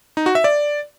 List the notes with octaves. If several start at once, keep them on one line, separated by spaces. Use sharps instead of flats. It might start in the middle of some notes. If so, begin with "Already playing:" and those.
D#4
F#4
E5
D5